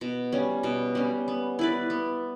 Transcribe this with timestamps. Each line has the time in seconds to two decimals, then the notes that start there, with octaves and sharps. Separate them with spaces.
0.01 B2
0.32 G3 C#4
0.63 B2
0.95 G3 C#4
1.28 B3
1.59 E4 B4 D5
1.90 B3